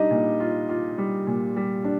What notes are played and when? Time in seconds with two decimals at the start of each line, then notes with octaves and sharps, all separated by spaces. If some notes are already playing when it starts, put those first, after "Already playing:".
Already playing: G3 D4 D#4 D#5
0.11 A#2
0.40 F4
0.69 F4
0.98 G3
1.27 A#2
1.56 G3
1.84 D4